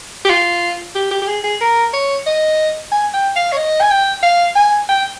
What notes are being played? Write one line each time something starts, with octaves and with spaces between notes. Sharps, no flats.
G4
F4
G4
G4
G4
G#4
G#4
A#4
C#5
D#5
G#5
G5
F5
C#5
D#5
G#5
G5
F5
G#5
G5